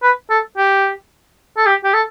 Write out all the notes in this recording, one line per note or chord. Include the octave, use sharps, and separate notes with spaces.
B4
A4
G4
A4
G4
G4
A4